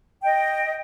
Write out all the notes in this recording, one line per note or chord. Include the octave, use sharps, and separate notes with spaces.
D#5 G5